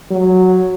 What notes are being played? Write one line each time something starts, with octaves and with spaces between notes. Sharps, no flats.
F#3